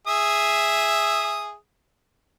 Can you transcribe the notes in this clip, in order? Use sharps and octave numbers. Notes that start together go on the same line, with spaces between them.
G#4 E5 D#6